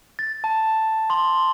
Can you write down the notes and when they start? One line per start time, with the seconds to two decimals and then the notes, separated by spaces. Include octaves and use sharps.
0.19 A6
0.44 A5
1.10 C6